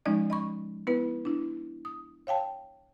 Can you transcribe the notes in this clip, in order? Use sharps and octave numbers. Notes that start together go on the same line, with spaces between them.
F3 G#3 C#4 D#4 D5 D#5
D#5 B5 C#6
B3 E4 B4
D4 E4
D#6
C#5 F5 G5 A5